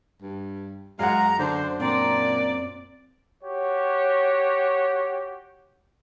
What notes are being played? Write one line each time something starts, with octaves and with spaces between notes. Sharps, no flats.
G2
F#2 G#3 F5 F#5 A#5
D3 D4 C5
A#2 C4 D5 A#5
F#4 G4 C#5